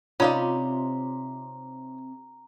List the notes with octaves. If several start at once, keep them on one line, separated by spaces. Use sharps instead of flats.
C3 C#4 D#4 F4 D5 F5 A#5